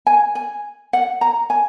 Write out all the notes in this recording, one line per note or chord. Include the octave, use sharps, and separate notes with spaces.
G#5
G#5
F#5
A#5
G#5